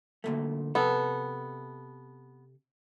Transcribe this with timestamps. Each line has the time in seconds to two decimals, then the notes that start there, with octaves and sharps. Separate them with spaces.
0.24 D2 A#2 A3
0.75 C3 B3 A4